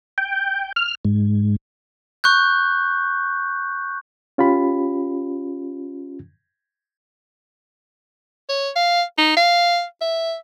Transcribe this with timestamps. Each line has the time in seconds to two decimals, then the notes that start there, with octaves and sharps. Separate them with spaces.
0.18 G5
0.76 F6
1.05 G#2
2.24 C#6 F#6 G6
4.38 C#4 F4 G4 B5
8.49 C#5
8.76 F5
9.18 D#4
9.37 F5
10.01 E5